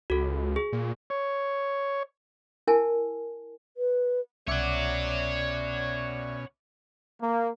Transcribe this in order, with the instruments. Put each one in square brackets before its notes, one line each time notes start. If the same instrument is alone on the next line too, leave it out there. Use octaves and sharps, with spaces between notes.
[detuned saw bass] C#2 [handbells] F#4 A4
[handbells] G#4
[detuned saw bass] A#2
[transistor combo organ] C#5
[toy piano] E4 A#4 G#5 A5
[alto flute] B4
[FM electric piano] C2 E5 D6 [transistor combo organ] B2 C#4 [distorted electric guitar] C#5 F#5 [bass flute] D5
[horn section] A#3